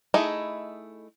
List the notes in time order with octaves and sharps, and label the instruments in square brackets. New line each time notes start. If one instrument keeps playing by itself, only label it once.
[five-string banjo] A3 D#4 E4 G#4 D#5